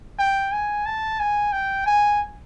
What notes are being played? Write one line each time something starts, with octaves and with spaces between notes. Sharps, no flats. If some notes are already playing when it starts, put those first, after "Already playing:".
G5
G#5
A5
G#5
G5
G#5